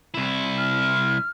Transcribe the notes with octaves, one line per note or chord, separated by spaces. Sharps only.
C2 E4
F6